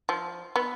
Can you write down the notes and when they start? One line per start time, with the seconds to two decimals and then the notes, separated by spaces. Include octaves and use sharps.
0.09 F3
0.56 B3